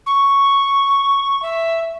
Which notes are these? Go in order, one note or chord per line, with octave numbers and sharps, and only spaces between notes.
C#6
E5